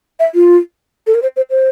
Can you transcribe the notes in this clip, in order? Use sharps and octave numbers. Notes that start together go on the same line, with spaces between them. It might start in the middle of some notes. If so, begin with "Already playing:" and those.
E5
F4
A4
A#4
C5
C5
C5